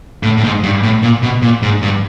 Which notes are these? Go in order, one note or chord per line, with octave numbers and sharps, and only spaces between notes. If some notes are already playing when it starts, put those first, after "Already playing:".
A2
A2
G#2
G2
A2
A#2
B2
A#2
G#2
G2